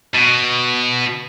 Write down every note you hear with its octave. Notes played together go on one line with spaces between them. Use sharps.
B2